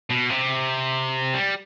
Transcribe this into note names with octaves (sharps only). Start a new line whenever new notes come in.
B2
C3
G3